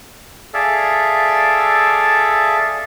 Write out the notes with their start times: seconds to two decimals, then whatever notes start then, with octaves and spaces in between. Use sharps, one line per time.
0.54 G#4 A4 D5 E5 F5